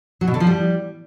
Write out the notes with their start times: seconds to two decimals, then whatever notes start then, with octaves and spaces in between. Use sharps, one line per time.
0.21 F#3
0.27 B2
0.34 D3
0.40 F3
0.47 G3